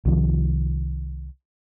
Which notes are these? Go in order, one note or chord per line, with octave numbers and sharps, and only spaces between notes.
C2 D#3 F3